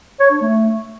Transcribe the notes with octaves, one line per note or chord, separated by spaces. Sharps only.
C#5
D4
A3